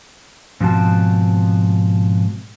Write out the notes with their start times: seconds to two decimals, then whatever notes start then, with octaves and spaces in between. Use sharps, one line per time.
0.61 G#2 B2 F3 C4 F#4 A5